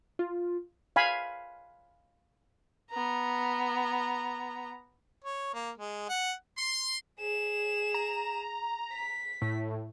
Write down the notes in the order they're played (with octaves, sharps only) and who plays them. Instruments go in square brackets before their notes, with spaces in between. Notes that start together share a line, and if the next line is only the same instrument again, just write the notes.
[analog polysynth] F4
[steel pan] F5 G#5 B5
[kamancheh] B3 A#5
[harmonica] C#5
A#3
G#3
F#5
[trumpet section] C6
[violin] G#4 E7
[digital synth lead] A#5
[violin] B6
[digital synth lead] A2